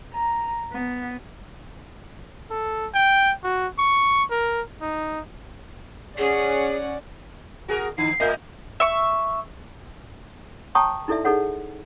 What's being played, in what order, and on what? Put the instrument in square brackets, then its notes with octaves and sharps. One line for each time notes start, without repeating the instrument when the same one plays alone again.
[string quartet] A#5
B3
[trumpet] A4
G5
F#4
C#6
A#4
D#4
[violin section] C#4 F#5 [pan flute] G#4 [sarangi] D5
[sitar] F#4 G#4 A#4
[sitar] D#3 [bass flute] D#4 [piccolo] C7
[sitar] A2 [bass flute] A#4 [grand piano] D#5 E5 G6
[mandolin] E5 C#6
[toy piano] C#5 G5 A5 A#5 C#6 D#6
D#4 E4 A4 D5 E5
D#4 G#4 A4 C#5 F#5